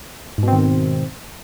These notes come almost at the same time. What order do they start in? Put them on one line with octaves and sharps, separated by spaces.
G#2 B2 C4 D#3